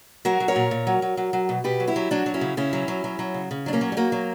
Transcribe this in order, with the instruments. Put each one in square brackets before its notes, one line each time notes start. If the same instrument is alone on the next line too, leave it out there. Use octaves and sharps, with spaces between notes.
[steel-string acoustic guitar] F#3 F#4 A#4
F#3
A#4 C#5
A#2
A#2
F#3
F#3
F#3
F#3
B2
B2 G4 B4
F#3
E4 G4
F#3
F#3 D4 F#4
F#3
C#4 E4
C#3
C#3 C#4 E4
F#3
F#3
F#3
F#3
C#3
C#3
F#3 D4
A#3 C#4
F#3
G3
F#3 A#3
F#3